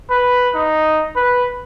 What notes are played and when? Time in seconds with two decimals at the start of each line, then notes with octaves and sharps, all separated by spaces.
0.10 B4
0.55 D#4
1.16 B4